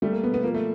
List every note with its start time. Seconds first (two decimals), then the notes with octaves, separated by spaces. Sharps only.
0.02 G3 A3
0.12 A#3
0.23 B2 B3
0.34 B3
0.44 F3 A#3
0.54 A3